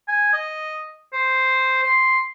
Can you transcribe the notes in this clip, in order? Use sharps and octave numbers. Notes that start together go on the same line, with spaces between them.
G#5
D#5
C5
C6